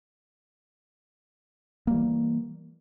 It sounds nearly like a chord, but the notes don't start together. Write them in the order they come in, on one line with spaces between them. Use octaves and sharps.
A#3 G3 E3